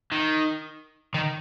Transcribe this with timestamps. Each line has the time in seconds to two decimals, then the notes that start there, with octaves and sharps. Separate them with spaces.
0.12 D#3
1.14 D#3